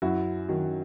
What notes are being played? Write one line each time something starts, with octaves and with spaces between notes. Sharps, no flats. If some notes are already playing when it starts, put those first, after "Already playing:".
F#2 E4 F#4
D#3 F#3